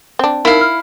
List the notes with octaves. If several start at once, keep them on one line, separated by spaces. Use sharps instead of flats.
C4 D4
D#4 E4 A#4 F5
F6